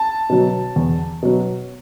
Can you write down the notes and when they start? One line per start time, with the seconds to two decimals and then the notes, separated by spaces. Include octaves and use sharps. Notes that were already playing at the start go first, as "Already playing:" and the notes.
Already playing: A5
0.29 B2 F#3
0.76 E2
1.22 B2 F#3